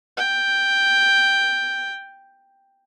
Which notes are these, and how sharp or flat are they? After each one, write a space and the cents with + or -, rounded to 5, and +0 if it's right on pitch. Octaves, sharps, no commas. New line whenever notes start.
G5 +5